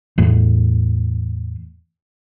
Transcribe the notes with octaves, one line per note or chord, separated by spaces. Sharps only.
E2 A2